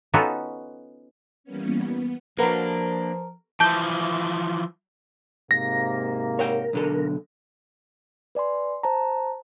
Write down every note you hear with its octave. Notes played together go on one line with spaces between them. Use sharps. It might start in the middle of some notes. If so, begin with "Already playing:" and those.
B3 C#4 D#4 F4 F#4 A4
E3 G3 A#3 B3 C#4
B3
F3 A#3 D4 F#4 A#4 B4
E3 F3 A5 G6 G7
G#2 C3 A#3 A#6
A#4 C#5 F#5 G5
B1 D3 A4
B4 D5 G#5 C6
C5 A5 A#5